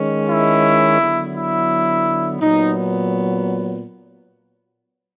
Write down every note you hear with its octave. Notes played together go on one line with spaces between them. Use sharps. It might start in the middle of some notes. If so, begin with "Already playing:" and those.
Already playing: D#3 G#3 C#4
E4
D3 F#3 B3
E4
A#2 F#3 B3 D#4